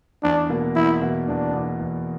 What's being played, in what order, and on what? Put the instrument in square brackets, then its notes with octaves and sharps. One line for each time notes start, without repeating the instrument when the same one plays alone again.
[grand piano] E2 [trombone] D4
[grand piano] B2 A#3
[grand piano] E2 [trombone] E4
[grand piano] B2 A#3
[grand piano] E2 [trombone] D4
[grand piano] B2 A#3
E2